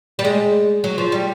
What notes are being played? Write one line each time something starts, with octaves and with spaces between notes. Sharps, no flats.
G3
G#3
F#3
F3
G3